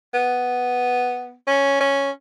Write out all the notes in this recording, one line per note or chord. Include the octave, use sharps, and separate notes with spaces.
B3
C#4
C#4